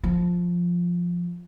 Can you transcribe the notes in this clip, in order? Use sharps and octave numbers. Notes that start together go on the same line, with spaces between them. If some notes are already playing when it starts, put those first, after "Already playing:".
F3